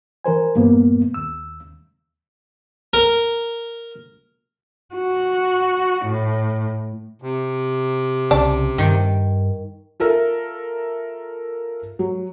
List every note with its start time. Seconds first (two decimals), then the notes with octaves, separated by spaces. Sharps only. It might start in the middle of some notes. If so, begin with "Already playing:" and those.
0.24 E3 A#4 C5 G#5
0.56 G2 A#2 A#3 B3
1.14 D#2 E6
2.93 A#4
4.94 F#4
6.05 A2
7.22 C3
8.31 C2 C#3 D4
8.78 G2 D#3
10.00 F4 A4 A#4 E5
11.99 F#3